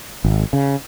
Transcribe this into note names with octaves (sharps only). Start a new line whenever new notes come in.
G#1
C#3